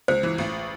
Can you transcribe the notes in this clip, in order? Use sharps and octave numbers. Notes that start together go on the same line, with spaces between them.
C#2 C5
E3
A1